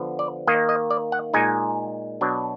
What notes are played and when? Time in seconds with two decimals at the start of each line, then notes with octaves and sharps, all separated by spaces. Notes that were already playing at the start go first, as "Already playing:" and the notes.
Already playing: D3 F3 B3
0.19 D5
0.47 D#3 A#3 D#4 D#5
0.69 D#5
0.91 D5
1.12 F#5
1.34 A#2 G#3 D#4 G#5
2.21 B2 F#3 D4